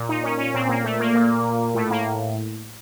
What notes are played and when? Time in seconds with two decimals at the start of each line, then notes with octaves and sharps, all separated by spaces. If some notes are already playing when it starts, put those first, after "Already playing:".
Already playing: A#2
0.09 D#4
0.24 C#4
0.39 C#4
0.54 A#2 C4
0.69 A#3
0.84 A3
1.00 A#3
1.15 A#2
1.75 A2 A3
1.91 A#3